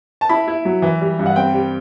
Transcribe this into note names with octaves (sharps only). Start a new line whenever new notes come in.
A5
E4 B5
E4
F#3
E3
G3
G2
F#5
C4 G5
G3